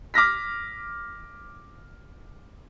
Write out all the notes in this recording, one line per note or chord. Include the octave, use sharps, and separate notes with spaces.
D6 F6 A#6 B6